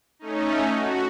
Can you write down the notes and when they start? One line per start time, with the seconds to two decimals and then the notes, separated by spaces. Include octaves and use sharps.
0.19 A3 C#4 D#4
0.73 F#4